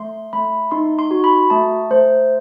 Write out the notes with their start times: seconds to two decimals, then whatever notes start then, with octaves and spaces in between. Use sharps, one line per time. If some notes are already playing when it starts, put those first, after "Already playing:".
Already playing: A3 C6
0.33 A3 B5
0.71 D#4 C6
0.99 C6
1.11 F#4
1.24 B5
1.50 A3 A5
1.90 A3 C5